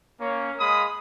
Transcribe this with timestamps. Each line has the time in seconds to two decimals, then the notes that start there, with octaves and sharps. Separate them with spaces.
0.19 A#3 C#4
0.59 G#3 F5 B5 D#6